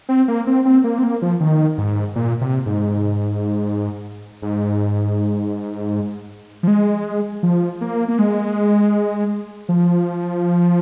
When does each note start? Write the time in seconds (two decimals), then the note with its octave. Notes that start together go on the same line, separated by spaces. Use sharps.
0.09 C4
0.28 A#3
0.47 C4
0.65 C4
0.84 A#3
0.99 C4
1.03 A#3
1.22 F3
1.40 D#3
1.78 G#2
2.16 A#2
2.41 C3
2.66 G#2
4.42 G#2
6.63 F3
6.68 G#3
7.43 F3
7.81 A#3
8.08 A#3
8.19 G#3
9.69 F3